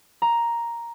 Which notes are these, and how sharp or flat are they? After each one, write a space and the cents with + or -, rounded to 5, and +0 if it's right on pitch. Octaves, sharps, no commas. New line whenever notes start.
A#5 +5